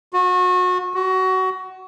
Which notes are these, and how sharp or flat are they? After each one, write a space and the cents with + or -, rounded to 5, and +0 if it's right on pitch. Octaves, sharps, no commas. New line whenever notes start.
F#4 -30
F#4 +20